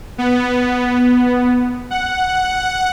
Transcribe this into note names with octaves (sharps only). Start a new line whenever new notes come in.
B3
F#5